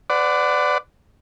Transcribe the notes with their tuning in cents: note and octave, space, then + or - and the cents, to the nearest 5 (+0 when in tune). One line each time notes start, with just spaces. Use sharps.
B4 +40 D5 +0 F#5 +0